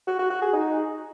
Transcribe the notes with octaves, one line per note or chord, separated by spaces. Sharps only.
F#4
F#4
F#4
G#4
D#4